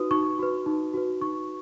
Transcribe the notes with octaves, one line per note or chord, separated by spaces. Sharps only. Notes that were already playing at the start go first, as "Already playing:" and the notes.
Already playing: D#4 F#4 B4 D#6
D#4 C#6
F#4 B4
D#4
F#4 B4
D#4 C#6